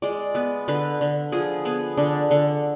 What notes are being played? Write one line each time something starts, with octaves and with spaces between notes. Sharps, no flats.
G#3 D5
B3
D3 B4
D3
F3 G#4
B3 G#4
D3 D4
D3